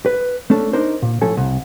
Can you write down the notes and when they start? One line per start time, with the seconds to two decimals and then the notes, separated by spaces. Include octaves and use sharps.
0.06 B4
0.50 A3 C#4 D4 A4
0.73 D4 D#4 A#4 C5
1.02 A#2
1.21 A2 F3 C#4 A4 G#5
1.37 C2